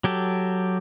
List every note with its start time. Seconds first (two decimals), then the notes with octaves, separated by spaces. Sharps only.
0.04 F#3 G4 A4